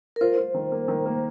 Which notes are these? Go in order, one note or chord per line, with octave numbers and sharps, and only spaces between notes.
A#4
F4 C5
F4
D#3
A#3
D#3
A#3